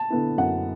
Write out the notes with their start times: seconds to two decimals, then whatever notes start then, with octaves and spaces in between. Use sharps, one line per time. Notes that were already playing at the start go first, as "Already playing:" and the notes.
Already playing: A5
0.10 D3 B3 E4
0.38 F#2 F#5